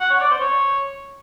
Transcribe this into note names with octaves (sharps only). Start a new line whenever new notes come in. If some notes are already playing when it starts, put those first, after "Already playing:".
F#5
C#5
D5
C5
C#5